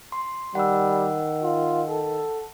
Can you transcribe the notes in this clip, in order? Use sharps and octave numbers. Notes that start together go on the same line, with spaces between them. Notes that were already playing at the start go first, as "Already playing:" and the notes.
C6
D#3 G3 F#5 E6
F4
A4